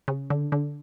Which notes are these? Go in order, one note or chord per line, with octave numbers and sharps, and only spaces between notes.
C#3
D3
D3